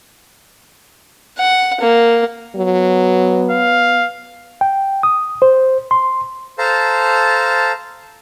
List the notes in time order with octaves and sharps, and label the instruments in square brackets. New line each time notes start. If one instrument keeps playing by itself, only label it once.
[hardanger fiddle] F#5
A#3
[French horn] F#3 [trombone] B3
[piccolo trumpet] F5
[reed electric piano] G5
D#6
C5
C6
[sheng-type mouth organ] A4 C5 F5 A5 A#5